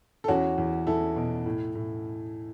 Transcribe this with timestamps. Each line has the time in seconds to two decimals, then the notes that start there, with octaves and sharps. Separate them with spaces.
0.24 A4
0.28 E2 C#4 F#4
0.58 E2
0.87 E2 E4 A4
1.16 B2
1.46 A2
1.75 A2